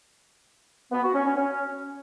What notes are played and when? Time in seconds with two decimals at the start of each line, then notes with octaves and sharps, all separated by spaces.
0.92 B3
1.03 F#4
1.14 C#4
1.25 C#4
1.36 C#4